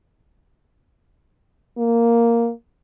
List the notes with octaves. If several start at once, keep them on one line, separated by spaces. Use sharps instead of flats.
A#3